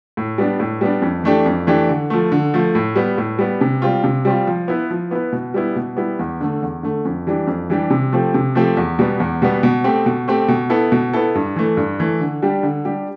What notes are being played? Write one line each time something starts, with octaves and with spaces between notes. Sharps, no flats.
A2
G3 B3 D4
A2
G3 B3 D4
F2
E3 A3 D4 G4
F2
E3 A3 D4 G4
D3
F3 A3
D3
F3 A3
A2
G3 B3
A2
G3 B3
C3
G3 C4 F4
C3
G3 C4 F4
F3
B3 E4 B4
F3
B3 E4 B4
B2
G3 B3 E4
B2
G3 B3 E4
E2
D3 A3
E2
D3 A3
F2
E3 G3 D4 G4
F2
E3 G3 D4 G4
C3
F3 A3 C4 G4
C3
F3 A3 C4 G4
E2
B2 G3 B3
E2
B2 G3 B3
B2
A3 C4 G4
B2
A3 C4 G4
B2
B3 E4 A4
B2
B3 E4 A4
G2
E3 A3
G2
E3 A3
D3
G3 D4 G4
D3
G3 D4 G4